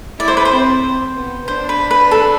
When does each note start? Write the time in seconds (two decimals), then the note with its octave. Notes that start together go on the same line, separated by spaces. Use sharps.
0.19 E4 D5
0.28 C5
0.37 B4
0.45 C5
0.51 C4
1.15 B3
1.47 D4 C5
1.69 B4
1.91 B4
2.11 A4